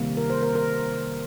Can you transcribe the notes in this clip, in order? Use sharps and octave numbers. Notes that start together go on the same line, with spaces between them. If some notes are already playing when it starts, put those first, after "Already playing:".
Already playing: C3 D#3 G3 A#3
A#4
C5
A#4
A#4